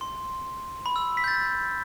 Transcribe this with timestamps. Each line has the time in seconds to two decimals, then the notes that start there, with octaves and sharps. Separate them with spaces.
0.01 C6
0.86 B5
0.96 E6
1.17 B6
1.24 G6
1.28 A6